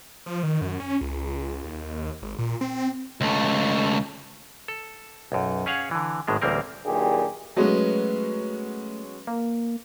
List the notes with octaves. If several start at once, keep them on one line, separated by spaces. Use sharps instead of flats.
F3
D#3
F#2
C#4
C#2
D#2
G#1
A#2
C4
C#2 A3
A4
B1 F#2
C#4 G#4 C#5 F5 F#5
D3 E3
G#1 A2 G#3 D4
A1 D2 G3 A#3 C4 A#4
G2 A#2 D#3 F#3 G4 G#4
F#3 G#3 A3 B3 C#4
A#3